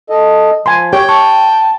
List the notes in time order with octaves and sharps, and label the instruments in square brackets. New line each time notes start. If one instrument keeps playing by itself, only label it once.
[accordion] A4 D#5
[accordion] F3 [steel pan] G#5 B5 C6
[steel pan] G4 C#5 [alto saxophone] G5
[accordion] A5 [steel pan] C#6